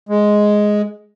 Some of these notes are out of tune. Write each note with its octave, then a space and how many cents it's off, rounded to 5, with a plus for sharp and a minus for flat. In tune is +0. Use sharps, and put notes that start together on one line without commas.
G#3 +5